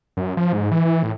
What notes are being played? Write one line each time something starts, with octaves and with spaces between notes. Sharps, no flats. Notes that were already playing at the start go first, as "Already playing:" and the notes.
F#2
F3
G#2
E3
E3
A2